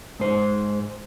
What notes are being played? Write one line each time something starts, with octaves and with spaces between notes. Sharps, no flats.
G#2 C5